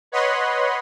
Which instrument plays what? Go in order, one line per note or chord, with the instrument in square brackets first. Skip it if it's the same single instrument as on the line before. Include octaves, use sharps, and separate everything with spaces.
[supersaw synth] B4 C#5 D#5 F#5 B5 C6